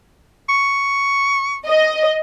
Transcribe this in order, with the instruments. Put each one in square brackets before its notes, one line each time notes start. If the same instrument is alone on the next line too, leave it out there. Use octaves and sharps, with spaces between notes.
[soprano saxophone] C#6
[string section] D#5